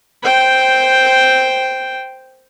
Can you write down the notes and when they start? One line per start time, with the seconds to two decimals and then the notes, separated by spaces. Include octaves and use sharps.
0.23 C5 G5